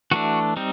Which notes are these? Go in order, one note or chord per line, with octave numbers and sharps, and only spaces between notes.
E3 A3 D4 F#4
G3 C4 D#4